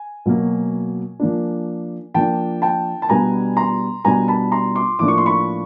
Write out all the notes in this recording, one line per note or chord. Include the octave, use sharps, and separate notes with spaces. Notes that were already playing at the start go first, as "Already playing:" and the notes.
Already playing: G#5
B2 F#3 A#3
F3 A#3 D4
F3 A#3 D4 G5 A5
G5 A5
A5
B2 G3 B3 D4 G#5 A#5
A#5 C6
B2 G3 B3 D4 G#5 A#5
A5 B5
A#5 C6
C6 D6
A2 F3 A#3 D4 D6
C#6
C6
B5 C#6